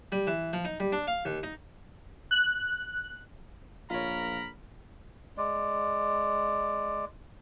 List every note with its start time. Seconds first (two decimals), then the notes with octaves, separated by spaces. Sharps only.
0.12 G3
0.27 E3
0.53 F3
0.65 D#4
0.80 G3
0.92 D4
1.07 F5
1.25 D#2
1.43 D#4
2.31 F#6
3.90 A#1 F4 A#4 C#5 A#5 B5
5.38 G#3 D5